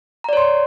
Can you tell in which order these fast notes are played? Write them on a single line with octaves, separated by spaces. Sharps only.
A#5 D5 C#5 C6